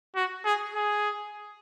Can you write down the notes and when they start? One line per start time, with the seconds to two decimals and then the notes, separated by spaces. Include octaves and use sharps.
0.16 F#4
0.45 G#4
0.75 G#4